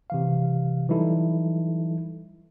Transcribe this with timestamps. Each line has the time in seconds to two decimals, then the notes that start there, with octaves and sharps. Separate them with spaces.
0.10 C3 E3 F5
0.89 E3 F#3 G3 D#4 E4 A4